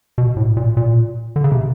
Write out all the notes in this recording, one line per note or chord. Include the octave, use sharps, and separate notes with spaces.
B2
A2
A#2
A#2
D3
C#3
C3